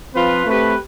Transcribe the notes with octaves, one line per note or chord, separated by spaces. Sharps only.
F3 C4 F4 B4
A3 C4 G4 B4